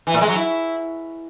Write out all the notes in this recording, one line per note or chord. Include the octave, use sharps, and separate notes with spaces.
E3
A#2
G#3
F#3
E4